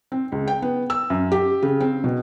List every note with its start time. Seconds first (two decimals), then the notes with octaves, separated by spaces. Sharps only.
0.12 C4
0.32 C#2
0.48 G5
0.62 B3
0.90 E6
1.10 F#2
1.32 G4
1.62 C#3
1.80 C4
2.04 B2